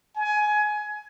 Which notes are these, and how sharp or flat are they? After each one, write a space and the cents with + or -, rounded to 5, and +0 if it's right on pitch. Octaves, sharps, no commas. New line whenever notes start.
G#5 +20